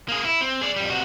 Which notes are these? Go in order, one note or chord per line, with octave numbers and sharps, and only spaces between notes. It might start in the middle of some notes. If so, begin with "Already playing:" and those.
A#3 G#4
E4
C4
G#4 D5
F2 G3
C3 F#4